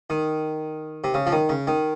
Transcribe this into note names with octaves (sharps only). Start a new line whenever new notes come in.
D#3
C3
C#3
F3
D#3
C#3
D#3